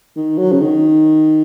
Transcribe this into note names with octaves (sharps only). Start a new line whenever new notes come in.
D#3
F#3
C#3
D#3